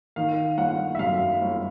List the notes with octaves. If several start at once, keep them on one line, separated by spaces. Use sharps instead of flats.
D#3 F5
G1 F#5
E5
F#2 F5
G1